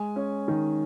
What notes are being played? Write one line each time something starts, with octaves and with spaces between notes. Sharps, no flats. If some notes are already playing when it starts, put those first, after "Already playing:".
Already playing: G#3 G#5
C#4
D#3